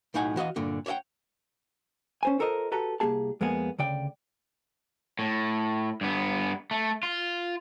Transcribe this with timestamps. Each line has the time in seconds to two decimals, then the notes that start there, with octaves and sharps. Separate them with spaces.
0.14 B1 A2 D#4 F#5 G#5
0.36 E3 F#4 D#5 F5
0.56 G2 A#2 D3
0.86 C#5 D5 E5 F#5 G5
2.23 C#4 C5 G#5
2.39 F4 A4 A#4 C5 C#5 D#5
2.72 F#4 G4 A4 B4 A#5
3.00 C2 A#3 G4 G#4 A5
3.41 F2 G#3 A#3 B3 G#4
3.79 D2 C#3 D5 G5
5.19 A2
6.01 G2 B3
6.71 A3
7.03 F4